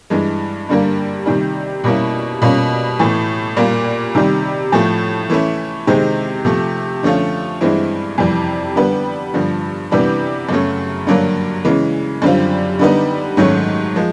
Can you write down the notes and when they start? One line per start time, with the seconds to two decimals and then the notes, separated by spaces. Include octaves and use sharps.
0.10 G2 E3 G#3
0.69 G2 D3 G3 A#3
1.26 C3 D#3 G3
1.84 B2 G3 A#3 C#4 E4
2.42 B2 G3 A#3 C#4 F4
2.99 A2 E3 A3
3.57 A#2 G3 A#3
4.15 C3 D#3 G3
4.72 A2 F3 A3
5.30 E3 A3 C#4 E4
5.87 C3 D#3 G#3 C4
6.45 C3 F3 A3
7.03 D3 F3 A3 C#4 F4
7.61 G2 E3 G#3 C4 E4
8.18 F2 C3 E3 G3
8.76 D3 G3 B3
9.34 G2 D3 F3
9.91 C3 E3 G3 B3 D4
10.49 F#2 C#3 F#3 A3
11.07 G2 D3 F#3 A#3 D4
11.65 C#3 E3 G#3
12.22 F#2 D3 G3 C4 F4
12.79 D3 G3 B3 D#4
13.37 G#2 D#3 F#3 A3 C#4
13.96 F3 G#3